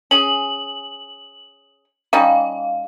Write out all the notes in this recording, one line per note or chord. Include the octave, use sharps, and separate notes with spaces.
C#4 G#4 F#7
G3 C#4 D#4 F5